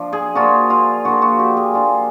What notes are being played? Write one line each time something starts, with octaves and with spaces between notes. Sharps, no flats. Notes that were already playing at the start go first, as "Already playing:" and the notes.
Already playing: F3 D4 F4
G#4
F3 A#3 D4 F4 F#4
F4
F3 A#3 D4 F4 F#4
F#4
G4
G#4
F3 A#3 D4 F4